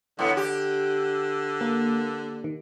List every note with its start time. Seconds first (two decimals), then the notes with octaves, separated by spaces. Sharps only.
0.19 A2 D3 B3
0.37 G4
1.61 A#3
2.44 D#3